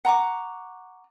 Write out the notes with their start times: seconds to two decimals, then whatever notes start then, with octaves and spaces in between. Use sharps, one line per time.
0.05 F#5 A#5 C#6 D6